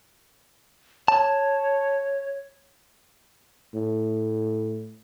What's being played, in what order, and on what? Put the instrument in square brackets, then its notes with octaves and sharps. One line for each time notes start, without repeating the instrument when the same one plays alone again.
[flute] C#5 [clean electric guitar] A5
[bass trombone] A2